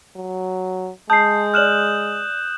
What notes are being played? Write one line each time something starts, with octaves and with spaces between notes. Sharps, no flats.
F#3
G#3 A5 D#6 G6 C7
D5 F6 F#6 E7 F#7